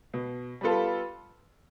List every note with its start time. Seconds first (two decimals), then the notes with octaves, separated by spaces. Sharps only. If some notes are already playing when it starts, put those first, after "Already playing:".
0.14 B2
0.61 G3 B3 F4 A4